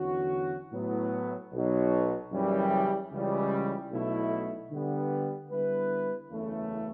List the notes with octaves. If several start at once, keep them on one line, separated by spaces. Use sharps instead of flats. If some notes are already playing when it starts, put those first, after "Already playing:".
Already playing: E2 D3 F#3 C#4 F#4
A2 F#3 B3
B1 B2 F#3
F#1 F#2 C#3 E3 G3
C#2 C#3 E3 G3
B1 B2 A3 E4
D3 G3 B3
D3 G3 B3 E4 B4
F#1 E2 C#3 E3 A3